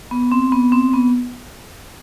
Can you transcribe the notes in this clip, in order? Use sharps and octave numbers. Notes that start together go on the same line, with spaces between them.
B3
C4
B3
C4
B3